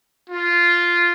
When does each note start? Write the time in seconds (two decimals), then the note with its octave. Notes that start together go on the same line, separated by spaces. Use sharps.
0.29 F4